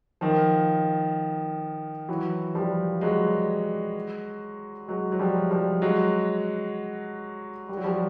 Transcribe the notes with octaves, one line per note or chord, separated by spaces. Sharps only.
D#3 F3
E3 F#3
F3 G3
F#3 G#3
F#3 G#3
F#3
F3 G3
F3 G3
F#3 G#3
G3
F#3
F3 G3